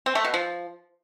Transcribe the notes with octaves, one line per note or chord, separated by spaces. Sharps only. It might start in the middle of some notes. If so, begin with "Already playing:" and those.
C4
A3
B2
F3